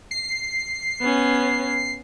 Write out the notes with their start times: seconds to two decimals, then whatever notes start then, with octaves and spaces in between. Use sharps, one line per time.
0.11 C7
1.02 B3 C#4